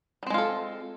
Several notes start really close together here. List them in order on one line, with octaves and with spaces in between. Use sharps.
G3 C4 G#3 F4 A4